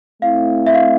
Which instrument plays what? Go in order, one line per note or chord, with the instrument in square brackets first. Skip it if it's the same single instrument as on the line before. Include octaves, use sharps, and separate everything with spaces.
[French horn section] A3 C4 E4 [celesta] F5
[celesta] E5
F5